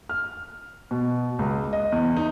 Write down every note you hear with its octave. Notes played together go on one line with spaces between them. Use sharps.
F6
B2
C#2
D#5
E2
D#4